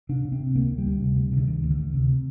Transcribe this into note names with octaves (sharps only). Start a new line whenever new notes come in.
C3 D4
C3
C4
C3
D2 A#3
D2
G3
D2
C3
D2
C3
D3
D2 D#3
D2
D3
D2
C3